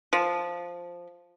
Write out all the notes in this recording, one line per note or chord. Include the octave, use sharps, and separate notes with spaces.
F3